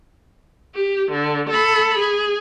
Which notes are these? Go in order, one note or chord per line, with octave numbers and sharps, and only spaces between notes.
G4
D3
A4 B5
G#4